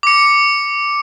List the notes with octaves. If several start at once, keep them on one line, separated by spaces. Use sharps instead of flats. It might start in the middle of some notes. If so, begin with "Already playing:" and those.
D6 C#7